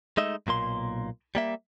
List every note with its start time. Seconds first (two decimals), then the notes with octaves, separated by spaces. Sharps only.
0.17 G#3 A3 D#4 D#5 E5
0.47 B1 A#2 A#3 C6
1.35 G3 A#3 E5